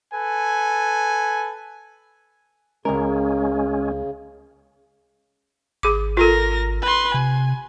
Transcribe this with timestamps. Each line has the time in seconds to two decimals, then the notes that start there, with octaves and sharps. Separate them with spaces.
0.13 A4 B4 G#5
2.85 C#2 C#3 G#3 C#4 A#4
5.83 G#1 G#4 D6
6.17 F4 A4 A#4 A#6
6.82 B4 C6
7.14 C3 G#5